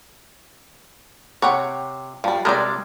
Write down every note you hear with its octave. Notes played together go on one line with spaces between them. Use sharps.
C3 C#5 F#5 G5
G2 F3 G3
C3 G3 G#3 A#4 D5